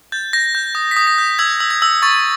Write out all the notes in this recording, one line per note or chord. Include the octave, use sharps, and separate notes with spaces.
G6 A6
G6 A#6
G6
D#6
B6
D#6
A#6
G6
E6 G#6
E6
G#6
E6
C#6 A6